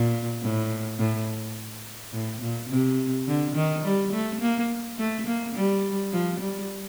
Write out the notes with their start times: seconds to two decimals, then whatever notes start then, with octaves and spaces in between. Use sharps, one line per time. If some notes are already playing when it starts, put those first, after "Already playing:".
Already playing: A#2
0.42 A2
0.99 A2
2.13 A2
2.42 A#2
2.70 C3
3.28 D3
3.56 D#3
3.84 G3
4.13 A3
4.41 A#3
4.99 A3
5.27 A#3
5.55 G3
6.13 F3
6.40 G3